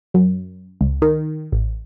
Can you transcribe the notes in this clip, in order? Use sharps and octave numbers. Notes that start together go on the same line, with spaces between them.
F#2
C#2
D#3
A1